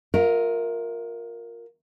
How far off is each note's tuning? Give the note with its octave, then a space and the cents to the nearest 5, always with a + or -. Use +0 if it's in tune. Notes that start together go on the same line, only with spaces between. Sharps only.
F4 +25 A#4 +0 E5 -5